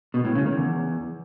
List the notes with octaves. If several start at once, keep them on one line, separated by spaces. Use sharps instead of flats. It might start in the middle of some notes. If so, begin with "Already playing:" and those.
B2
A2
C#3
D#3
E2